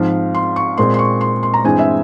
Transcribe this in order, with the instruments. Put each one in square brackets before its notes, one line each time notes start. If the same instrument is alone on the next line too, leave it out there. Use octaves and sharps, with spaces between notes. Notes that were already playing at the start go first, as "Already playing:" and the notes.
Already playing: [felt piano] G#2 F3 C4 F5
C6
C#6
A#2 G#3 C4 C6
C6
C#6
C6
C6
A#5
G2 E3 G#3 C4 G#5
E5